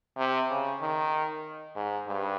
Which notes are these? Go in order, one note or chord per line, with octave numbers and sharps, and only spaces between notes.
C3
C#3
D#3
G#2
G2